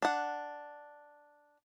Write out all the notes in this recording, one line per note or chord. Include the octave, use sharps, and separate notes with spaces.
D4 F#5